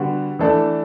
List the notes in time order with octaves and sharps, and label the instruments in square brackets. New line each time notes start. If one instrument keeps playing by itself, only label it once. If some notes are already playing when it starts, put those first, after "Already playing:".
Already playing: [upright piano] D3 G3 B3 F#4
E3 A3 D4 A4